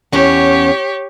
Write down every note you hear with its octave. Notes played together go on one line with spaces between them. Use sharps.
E2 C#4 G4 C#5 F#5